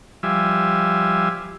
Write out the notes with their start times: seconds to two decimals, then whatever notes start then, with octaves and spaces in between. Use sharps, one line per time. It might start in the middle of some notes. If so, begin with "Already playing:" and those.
0.23 F3 G3 E5 G#5